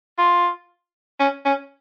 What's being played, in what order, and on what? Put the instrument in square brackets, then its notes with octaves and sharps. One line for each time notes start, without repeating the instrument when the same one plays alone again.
[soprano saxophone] F4
C#4
C#4